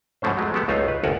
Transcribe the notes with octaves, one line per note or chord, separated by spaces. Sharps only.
G#2 B2 F3 A3 C#4 C5
F#3 G#3 A3
G#3 A3 B3 G4 A4
C#2 A3 D#4 F4 C5 A#5
B4
G1 D2 A4 A#4 F#5 G#5